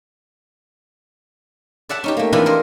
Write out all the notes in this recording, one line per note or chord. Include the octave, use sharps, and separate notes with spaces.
D5 E5 F#5 A5
C#4 D#4 G4
A3 A#3
C3 E3 F3 D4 A4 B4
A#4 C5 D5 D#5